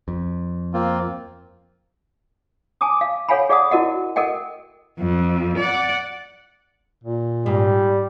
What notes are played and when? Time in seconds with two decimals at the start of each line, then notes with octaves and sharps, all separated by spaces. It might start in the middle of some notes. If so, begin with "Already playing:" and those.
0.08 F2
0.74 A#3 C4 F4
2.81 G#5 A5 D6 D#6
3.01 F5
3.29 A4 C#5 F5 F#5 G#5 B5
3.49 G#4 D5 F5 F#5 A5 D#6
3.71 E4 F#4 A#4 D#5 F#5
4.16 A4 A#4 D#5 F#5 G5
4.99 F2
5.58 D5 F#5
7.04 A#2
7.46 G#2 G3